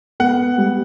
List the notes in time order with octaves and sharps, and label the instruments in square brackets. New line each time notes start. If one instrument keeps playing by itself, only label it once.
[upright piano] B3 [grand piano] F#5
[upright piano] G3